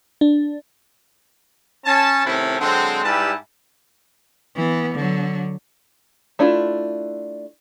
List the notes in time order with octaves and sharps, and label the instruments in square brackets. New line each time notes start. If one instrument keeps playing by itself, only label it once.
[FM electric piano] D4
[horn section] C#4 A5
C3 D#3 A3 C#4 E4
D3 F#3 G#3 C4
G#2 G3 E4 G4 B4 A5
[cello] E3 B3
D3 F#3
[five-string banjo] A3 D4 E4 F4